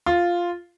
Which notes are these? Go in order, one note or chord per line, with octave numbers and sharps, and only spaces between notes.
F4